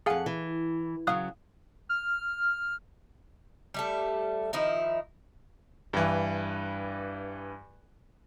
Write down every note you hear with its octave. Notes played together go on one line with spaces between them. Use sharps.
F2 G#4 F5 F#5 G#5
E3
C#3 F#3 F5 D#6 F#6
F6
G3 A3 A4
D#3 F3 D#4 E4
G2 E3